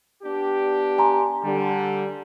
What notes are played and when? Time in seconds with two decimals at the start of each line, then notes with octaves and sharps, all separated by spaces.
0.23 B3 D4 G4
0.98 G#5 A#5 C6
1.43 D3 G3